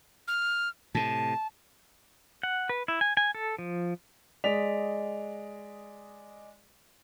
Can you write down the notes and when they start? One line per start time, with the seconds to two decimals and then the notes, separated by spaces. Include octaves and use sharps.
0.28 F6
0.95 A2 C3 A5
2.43 F#5
2.69 B4
2.88 E4
3.01 G#5
3.17 G#5
3.35 A4
3.59 F3
4.44 G#3 D5 D#5 B6 F7